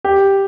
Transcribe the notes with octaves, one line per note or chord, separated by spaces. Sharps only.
G4